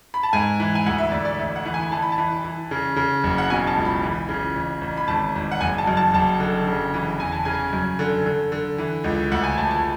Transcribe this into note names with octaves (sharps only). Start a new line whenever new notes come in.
B5
A5
G#2 G#5
E3
G#5
D2 F#5
E5
D2 D5
D5
A1 E5
F#5
E3
G#5
E3 A5
B5
A5
E3
E3
C#3
C#3
F#1
F#5
B2 G#5
A5
C#2
B5
E3
C#3
A1
A1
B5
G#1 A5
G#1
F#5
F#1 G#5
A5
F#2
A5
F#1 A5
D3
C#3
E3
E2 G#5
A5
C#3 G#5
F#2
D3
D3
D3
E3
C#2
D2 F#5
G#5
D2 A5
A5